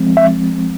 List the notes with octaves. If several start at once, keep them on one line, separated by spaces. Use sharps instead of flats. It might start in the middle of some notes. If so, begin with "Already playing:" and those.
Already playing: F3 G#3 C4
E5